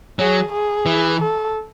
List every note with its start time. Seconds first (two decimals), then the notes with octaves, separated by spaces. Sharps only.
0.19 F#3 G#4
0.52 G#4
0.86 E3
1.19 A4